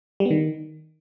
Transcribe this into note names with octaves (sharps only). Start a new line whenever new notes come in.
G3
B3
D#3